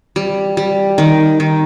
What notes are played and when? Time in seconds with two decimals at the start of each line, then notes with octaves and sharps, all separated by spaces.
0.16 G3
0.57 G3
0.98 D#3
1.40 D#3